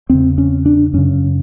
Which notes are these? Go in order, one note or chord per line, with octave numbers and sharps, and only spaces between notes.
E2 C#3 C4
C#4
D4
F#2 C#3 C#4